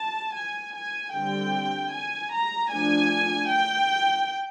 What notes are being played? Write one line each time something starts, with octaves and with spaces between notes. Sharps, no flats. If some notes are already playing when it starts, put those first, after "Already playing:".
Already playing: A5
G#5
G#5
D3 G3 C4 G5
G#5
A#5
F3 A3 D4 G#5
G5